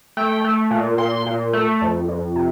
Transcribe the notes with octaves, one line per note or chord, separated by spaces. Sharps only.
A3 G5
A3
A#2
A#2 C6
A#2
A3
F2
F2
C3